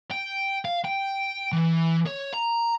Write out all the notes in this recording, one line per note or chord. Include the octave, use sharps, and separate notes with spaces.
G5
F5
G5
E3
C#5
A#5